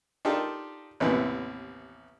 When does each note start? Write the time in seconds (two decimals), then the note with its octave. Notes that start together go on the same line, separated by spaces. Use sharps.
0.25 D4 D#4 F4 G4 A4 A#4
1.00 A1 D#2 C3 B3 E4